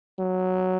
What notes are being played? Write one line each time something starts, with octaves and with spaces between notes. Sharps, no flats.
F#3